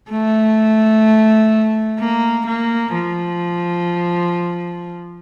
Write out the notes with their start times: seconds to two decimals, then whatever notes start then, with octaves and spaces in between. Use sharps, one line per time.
0.11 A3
1.99 A#3
2.47 A#3
2.93 F3